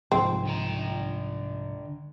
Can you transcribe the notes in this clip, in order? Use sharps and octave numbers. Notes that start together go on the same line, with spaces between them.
C2 G#2 F3 C4
D3 G5 A#5